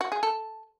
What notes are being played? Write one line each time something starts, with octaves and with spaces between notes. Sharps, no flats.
F#4
G#4
A4